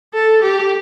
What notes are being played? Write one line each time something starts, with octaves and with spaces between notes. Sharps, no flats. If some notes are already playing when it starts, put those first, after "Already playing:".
A4
G4